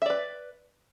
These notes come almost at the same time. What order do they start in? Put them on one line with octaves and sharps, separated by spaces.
E5 D5 B4